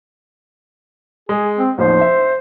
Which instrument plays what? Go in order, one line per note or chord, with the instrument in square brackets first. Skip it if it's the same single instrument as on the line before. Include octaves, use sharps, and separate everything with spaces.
[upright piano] G#3 [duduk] G#4
[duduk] C4
[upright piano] A1 D#2 F3 [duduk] C5
[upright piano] E5